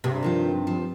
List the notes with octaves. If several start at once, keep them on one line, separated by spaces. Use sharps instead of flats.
G2 C3 G#3
D#3 F3 F4
F3